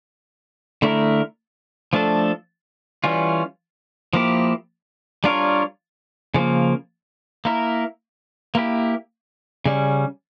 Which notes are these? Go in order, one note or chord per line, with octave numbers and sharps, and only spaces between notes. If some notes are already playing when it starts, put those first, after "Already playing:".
D3 A3 E4 A#4
F3 A3 D4 A4
E3 G3 C#4 F4
F3 A#3 E4 G4
G3 D4 F4 A#4 C#5
C#3 F3 A#3
A#3 E4 A#4
A#3 E4 G4
C#3 G3 C#4